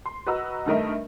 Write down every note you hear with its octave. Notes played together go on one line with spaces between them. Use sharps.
C6
F#4 B4 D#5 A#5 E6
G2 D#3 A3 A#4 D#5 E5